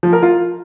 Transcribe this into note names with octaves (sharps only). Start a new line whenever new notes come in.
F3
A#4
F4